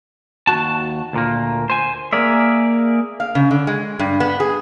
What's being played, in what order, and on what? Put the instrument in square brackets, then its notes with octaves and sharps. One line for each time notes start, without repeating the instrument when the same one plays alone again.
[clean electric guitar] D#2 F#3 F#4 A5
D2 A#2 A#3
C5 G#5
[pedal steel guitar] A#3 G#4 A#4 D5 E5
[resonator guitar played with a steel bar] F5
C#3
D3
G#3
G2
B3
G#4